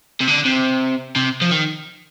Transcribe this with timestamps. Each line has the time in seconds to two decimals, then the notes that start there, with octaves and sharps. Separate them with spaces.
0.21 C3
0.28 D3
0.45 C3
1.16 C3
1.41 F3
1.51 D#3